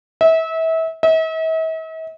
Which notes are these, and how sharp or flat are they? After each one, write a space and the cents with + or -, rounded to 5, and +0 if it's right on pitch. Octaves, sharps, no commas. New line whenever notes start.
E5 -30
E5 -45